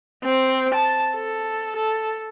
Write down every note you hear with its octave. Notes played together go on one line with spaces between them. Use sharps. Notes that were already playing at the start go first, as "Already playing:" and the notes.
C4
A5
A4
A4